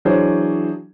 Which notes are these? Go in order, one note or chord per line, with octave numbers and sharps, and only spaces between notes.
E3 F#3 D4 G#4 C5 C#5